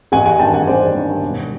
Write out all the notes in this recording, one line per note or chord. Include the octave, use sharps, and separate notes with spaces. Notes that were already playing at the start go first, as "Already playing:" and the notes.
A1 F#5 G#5
F#5 G#5
G2 D#3 G5 A5
F#5 G#5
A1 C5 D5
G2 D#3
E1